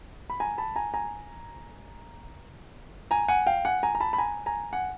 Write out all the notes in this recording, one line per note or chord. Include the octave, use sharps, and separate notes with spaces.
B5
G#5 A#5
A5 B5
G#5 A#5
G#5 A#5
G#5 A#5
F#5 G#5
F5 G5
F#5 G#5
G#5 A#5
A#5
A5 B5
B5
G#5 A#5
G#5 A#5
F#5 G#5